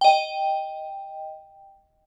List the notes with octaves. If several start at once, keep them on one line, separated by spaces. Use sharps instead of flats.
D#5 G5